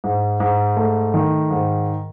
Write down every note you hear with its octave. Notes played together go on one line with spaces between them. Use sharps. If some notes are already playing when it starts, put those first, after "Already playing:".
G#2
G#2
A3
D#3
G#2